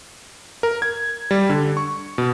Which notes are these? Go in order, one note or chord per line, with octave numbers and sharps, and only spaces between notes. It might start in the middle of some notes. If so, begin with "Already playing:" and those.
A#4
G#6
G3
D3
C#6
B2